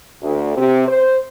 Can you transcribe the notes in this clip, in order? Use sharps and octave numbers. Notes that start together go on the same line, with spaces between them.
D2
C3
C5